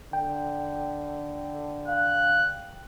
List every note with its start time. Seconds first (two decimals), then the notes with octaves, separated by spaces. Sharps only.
0.13 D3 G5
1.88 F5 F#6